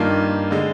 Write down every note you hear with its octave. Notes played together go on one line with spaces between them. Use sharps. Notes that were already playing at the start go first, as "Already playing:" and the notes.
Already playing: G2 D#3 A#3 F4
D3 G#3